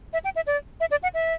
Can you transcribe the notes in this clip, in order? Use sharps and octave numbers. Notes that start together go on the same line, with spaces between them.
E5
G5
E5
D5
E5
D5
F#5
E5